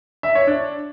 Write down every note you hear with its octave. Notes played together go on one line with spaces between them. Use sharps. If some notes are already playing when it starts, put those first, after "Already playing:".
E5
C#5
D4